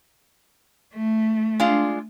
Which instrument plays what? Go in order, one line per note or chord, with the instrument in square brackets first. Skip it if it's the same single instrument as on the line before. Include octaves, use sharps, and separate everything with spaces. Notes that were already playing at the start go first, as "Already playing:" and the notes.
[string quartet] A3
[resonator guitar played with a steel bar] G#3 D4 F4